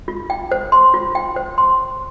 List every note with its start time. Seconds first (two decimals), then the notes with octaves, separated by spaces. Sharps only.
0.08 F4
0.30 G5
0.51 C5
0.72 C6
0.94 F4
1.15 G5
1.36 C5
1.58 C6